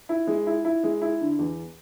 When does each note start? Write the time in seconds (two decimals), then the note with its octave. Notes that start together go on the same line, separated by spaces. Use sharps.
0.09 E4
0.27 G#3
0.47 E4
0.65 E4
0.84 G#3
1.02 E4
1.21 D3
1.39 E2